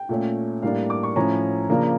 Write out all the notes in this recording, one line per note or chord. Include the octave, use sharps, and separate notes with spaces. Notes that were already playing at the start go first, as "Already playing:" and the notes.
Already playing: G5
A#2 A3 C#4
A2 G3 A#3 D4 F5
D6
C#6
A2 F3 C#4 A#5
C#3 F3 A#3 D4